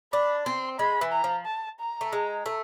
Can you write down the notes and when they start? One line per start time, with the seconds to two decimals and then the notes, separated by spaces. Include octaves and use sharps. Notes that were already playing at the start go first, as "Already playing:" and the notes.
0.13 D4 B5
0.46 C4 C6
0.79 G#3 B5
1.01 E3
1.12 A#5
1.24 F3
1.46 A5
1.80 A#5
2.01 A3
2.13 G#3
2.46 A3